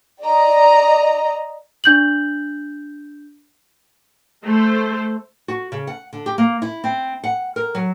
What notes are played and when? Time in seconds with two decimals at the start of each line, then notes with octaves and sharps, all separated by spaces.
0.23 D5 D#5 A#5
1.84 D4 G6 F#7
4.44 A3 A4 C5
5.48 F#4
5.72 C#3
5.87 F#5
6.13 D3
6.26 G4
6.38 A#3
6.62 E4
6.84 C4
7.24 F#5
7.56 A#4
7.75 F#3